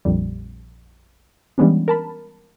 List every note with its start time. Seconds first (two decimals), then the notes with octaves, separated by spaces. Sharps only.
0.05 A#1 F2 G3
1.58 E3 G3 G#3 B3 C#4 D4
1.88 A#4 A5 B5